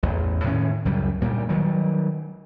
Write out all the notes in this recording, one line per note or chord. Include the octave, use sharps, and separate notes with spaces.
A1 E2
A2 D#3 C#4
C#2 F#2 G3
D2 A#2 G3
D#3 F#3 G3